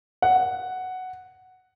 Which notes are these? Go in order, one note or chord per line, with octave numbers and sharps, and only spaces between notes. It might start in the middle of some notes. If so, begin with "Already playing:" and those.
F#5